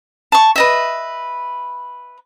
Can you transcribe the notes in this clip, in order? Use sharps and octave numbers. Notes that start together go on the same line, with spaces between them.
A5 C#6
B4 D#5 E5